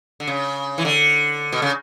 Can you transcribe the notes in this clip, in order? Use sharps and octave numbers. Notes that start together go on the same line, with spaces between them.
D3
C#3
E3
D3
B2
C#3